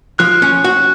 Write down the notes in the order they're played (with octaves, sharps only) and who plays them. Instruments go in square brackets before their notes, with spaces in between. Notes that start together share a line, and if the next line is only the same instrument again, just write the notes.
[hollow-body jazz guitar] F3 [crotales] F#6
[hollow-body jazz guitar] C#4
F#4